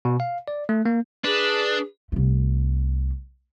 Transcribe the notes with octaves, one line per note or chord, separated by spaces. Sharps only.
B2
F5
D5
A3
A#3
D4 G#4 B4
C2 A3